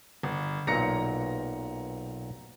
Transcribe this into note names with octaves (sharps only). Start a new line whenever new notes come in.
G1
B1 A#2 A#5 A#6 C#7